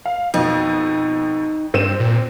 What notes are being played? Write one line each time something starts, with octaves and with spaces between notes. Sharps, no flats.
F5
F2 B2 D#4
G2 C4 D#7 E7
A#2